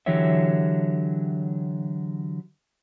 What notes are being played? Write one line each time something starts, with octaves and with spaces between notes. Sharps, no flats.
D3 E3 F#3 G4 C#5 E5